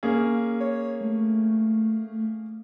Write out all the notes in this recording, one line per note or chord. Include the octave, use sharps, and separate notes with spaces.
A#3 C#4 G#4
C#5
A3